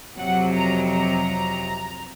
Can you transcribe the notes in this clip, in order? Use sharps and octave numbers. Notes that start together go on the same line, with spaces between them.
F2 C3 F#3 F#5
A#5
A#5